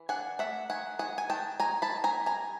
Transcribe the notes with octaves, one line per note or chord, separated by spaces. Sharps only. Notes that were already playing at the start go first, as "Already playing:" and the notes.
Already playing: E3
D4 F#5 G#5
A3 E5 F#5
D#3 F#5 G#5
D#3 F#5 G#5
G#5
D#3 G5 A5
D#3 G#5 A#5
A5 B5
D#3
G#5 A#5
G3
G#5 A#5